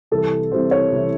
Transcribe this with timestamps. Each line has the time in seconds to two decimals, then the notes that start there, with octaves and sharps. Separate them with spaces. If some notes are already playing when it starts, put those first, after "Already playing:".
0.11 C2 C3 E3 A4
0.52 C2 C3 E3 C5
0.71 C#5
0.92 C2 C3 E3